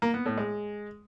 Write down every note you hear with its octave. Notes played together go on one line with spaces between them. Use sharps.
A#3
B3
A2
G#3